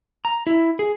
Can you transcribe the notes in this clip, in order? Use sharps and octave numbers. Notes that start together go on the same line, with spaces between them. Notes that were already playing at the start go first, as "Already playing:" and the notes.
A#5
E4
G#4